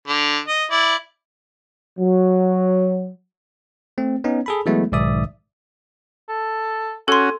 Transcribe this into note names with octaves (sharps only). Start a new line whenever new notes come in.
D3
D#5
E4 D5
F#3
A3 C4
B3 C#4 D#4
G#4 A4 B5
E3 F#3 G#3 A3 B3 E4
B1 G#2 D#3 D5 E5 D#6
A4
C#4 F#4 A4 G#5 C6